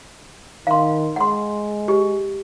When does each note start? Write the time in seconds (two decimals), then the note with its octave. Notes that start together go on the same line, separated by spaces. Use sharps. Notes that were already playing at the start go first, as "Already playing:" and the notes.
0.67 D#3 F5 C6
1.16 G#3 F#5 C6
1.88 G4